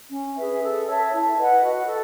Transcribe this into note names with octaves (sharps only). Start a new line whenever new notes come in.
C#4
G#4 B4 E5
A4
C#5 E5 A5
E4
B4 D#5 F#5
F#4
A4